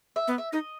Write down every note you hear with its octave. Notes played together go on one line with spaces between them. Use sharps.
E5
B3
E5
D#4 D#5